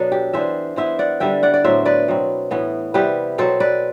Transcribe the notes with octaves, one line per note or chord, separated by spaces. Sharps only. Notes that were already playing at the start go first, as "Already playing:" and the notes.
Already playing: B2 F#3 B3 D4 A4 B4
G4
E3 B3 D4 C5 E5
E3 B3 E4 C5 E5
D5 F#5
D3 G3 D4 E5 G5
D5 F#5
D5
A2 F#3 B3 C5 E5
B4 D5
B2 F#3 C4
A2 E3 B3
C3 G3 B3 E4 G4 B4
B2 F#3 C4 A4 C5
B4 D5